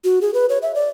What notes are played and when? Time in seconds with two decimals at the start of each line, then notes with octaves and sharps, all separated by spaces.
0.04 F#4
0.21 G#4
0.34 B4
0.49 C#5
0.62 E5
0.75 D5